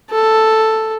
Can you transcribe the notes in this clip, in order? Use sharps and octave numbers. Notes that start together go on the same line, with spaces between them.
A4